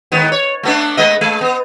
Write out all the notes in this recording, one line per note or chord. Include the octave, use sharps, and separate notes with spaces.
G#2 D#3 B3
C#5
A3 B3 D4
G#3 B3 D#5
G#3
B3